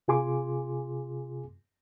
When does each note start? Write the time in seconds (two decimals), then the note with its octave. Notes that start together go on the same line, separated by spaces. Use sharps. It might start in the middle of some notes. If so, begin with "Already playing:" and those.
0.08 C3 F4 G#4 G#5 C6 D6